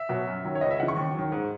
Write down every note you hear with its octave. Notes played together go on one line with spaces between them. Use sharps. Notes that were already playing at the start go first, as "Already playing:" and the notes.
Already playing: E5
B2 F#3
F#2
D#3 F#3
C#5
C#2 D#5
E5
C#3 E3 F#5
C#6
D#2
D#3 F#3
G#2